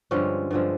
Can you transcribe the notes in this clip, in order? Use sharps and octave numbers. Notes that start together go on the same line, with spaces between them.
G2 D3 F3 G#3 C#4
G2 D3 F3 G#3